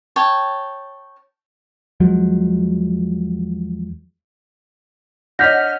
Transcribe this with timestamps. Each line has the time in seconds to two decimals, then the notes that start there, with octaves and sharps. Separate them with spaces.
0.16 C#5 G5 A5
2.00 E2 F3 F#3 G#3
5.39 D4 C#5 D#5 F#5 F6 G6 A#6 B6